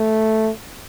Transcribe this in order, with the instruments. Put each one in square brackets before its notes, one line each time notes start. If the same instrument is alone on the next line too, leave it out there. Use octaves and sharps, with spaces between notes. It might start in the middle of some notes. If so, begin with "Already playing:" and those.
Already playing: [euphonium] A3